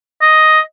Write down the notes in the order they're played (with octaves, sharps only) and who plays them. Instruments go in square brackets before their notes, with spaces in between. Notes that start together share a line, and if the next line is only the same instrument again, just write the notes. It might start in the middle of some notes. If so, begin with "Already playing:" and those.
[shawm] D#5